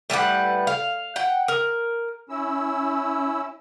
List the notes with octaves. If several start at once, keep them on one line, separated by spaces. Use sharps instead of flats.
A2 G3 B4 F#5
F5
F#5 G5
A#4
C#4 E4 E6